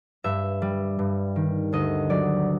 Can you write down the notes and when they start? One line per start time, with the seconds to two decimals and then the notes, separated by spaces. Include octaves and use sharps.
0.24 G2 E5
0.62 G3
0.99 G2
1.36 D#3
1.73 D2 D#5
2.10 F#3 D5